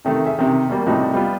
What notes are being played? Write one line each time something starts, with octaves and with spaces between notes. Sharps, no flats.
C3 D#3 A3
G#4 E5
C3 D#3
B2 G3 A#3
A2 C3 F3 G3 D#4 F#4
G3 B3 F4